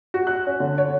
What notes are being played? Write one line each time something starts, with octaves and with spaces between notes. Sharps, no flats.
F#4
F#6
C#4
D3
C#5